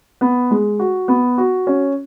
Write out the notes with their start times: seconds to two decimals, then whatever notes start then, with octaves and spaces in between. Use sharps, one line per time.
0.21 B3
0.51 G#3
0.79 F#4
1.08 B3
1.38 F#4
1.67 C#4